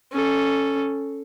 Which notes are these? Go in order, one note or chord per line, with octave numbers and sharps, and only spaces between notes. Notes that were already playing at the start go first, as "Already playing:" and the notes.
C#4 A4